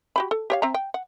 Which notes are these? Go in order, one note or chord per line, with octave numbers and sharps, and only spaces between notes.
F#4 G4 B5
A4
G4 C#5 F5
C4 E5 A#5
G5
F#5